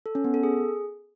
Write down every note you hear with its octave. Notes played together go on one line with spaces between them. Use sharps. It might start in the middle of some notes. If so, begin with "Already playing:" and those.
A4
C#4
B3
A4
G#4